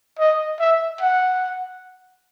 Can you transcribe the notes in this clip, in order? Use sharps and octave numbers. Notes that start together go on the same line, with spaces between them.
D#5
E5
F#5